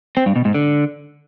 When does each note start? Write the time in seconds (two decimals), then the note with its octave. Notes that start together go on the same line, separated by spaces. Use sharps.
0.17 C4
0.26 G2
0.36 B2
0.45 G#2
0.54 D3